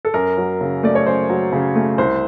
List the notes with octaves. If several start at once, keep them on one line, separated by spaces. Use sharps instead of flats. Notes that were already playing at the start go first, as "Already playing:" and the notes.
A4
F#2 A#4
F#3
C#3
A3 D5
C#5
F#2 C5
F#3
C#3
A3
C2 C5